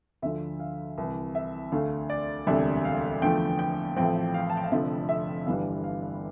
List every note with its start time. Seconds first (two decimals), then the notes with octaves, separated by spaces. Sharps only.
0.22 D2 D3 F3 E5
0.60 F5
0.98 C2 C3 E3
1.35 E5
1.72 D2 D3 A3 F5
2.10 D5
2.47 E1 D2 C3 G3 D4 E5
2.85 F5
3.22 E2 D3 F3 A3 G5
3.59 G5
3.96 A1 A2 F3 C4 G5
4.34 F5
4.50 A5
4.57 G5
4.64 F5
4.71 F1 F2 D3 F3 E5
5.09 E5
5.46 G1 G2 E3 G3 D4 F5
5.84 F5